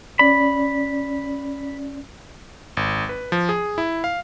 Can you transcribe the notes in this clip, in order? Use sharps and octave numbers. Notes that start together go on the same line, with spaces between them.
C#4 D5 B5
G#1
B4
F3
G#4
E4
F5